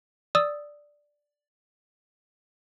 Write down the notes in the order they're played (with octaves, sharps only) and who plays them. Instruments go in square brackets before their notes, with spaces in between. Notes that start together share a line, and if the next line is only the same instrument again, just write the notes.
[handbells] D5 D#6 E6